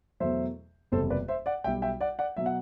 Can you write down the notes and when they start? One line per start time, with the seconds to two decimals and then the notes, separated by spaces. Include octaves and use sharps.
0.20 E2 B2 F#3 A3 C5 E5
0.92 F#1 E2 C3 G3 A4 C5
1.10 B4 D5
1.28 C5 E5
1.46 D5 F#5
1.64 B1 B2 G3 E5 G5
1.82 E5 G5
2.01 D5 F#5
2.19 D5 F#5
2.37 B2 F#3 E5
2.46 F#5